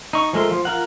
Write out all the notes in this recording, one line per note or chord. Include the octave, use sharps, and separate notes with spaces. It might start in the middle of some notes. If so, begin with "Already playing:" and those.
D#4 C#6
F3 G#3 A3 A#4 C6
F3 F4
F4 A#4 F#5